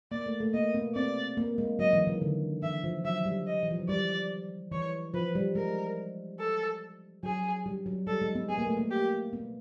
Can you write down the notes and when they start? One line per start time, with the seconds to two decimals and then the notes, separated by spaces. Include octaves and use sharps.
0.11 A#3 D5
0.26 A3
0.40 A3
0.54 A#3 D#5
0.74 B3
0.95 C4 D5
1.37 A#3
1.58 G#3
1.79 F#3 D#5
1.93 E3
2.07 D#3
2.22 D3
2.62 E3 E5
2.84 F3
3.05 F#3 E5
3.26 G3
3.47 D#5
3.63 E3
3.71 F3
3.79 F#3
3.89 G3 D5
4.72 E3 C#5
5.14 F3 B4
5.35 G3
5.55 G#3 A#4
6.39 A4
7.23 F#3 G#4
7.66 G3
7.86 F#3
8.07 G3 A4
8.22 G#3
8.35 B3
8.49 B3 G#4
8.58 A#3
8.67 A3
8.77 A#3
8.91 G4
9.33 B3